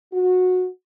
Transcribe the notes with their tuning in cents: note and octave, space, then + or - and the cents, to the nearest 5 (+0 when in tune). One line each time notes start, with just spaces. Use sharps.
F#4 -20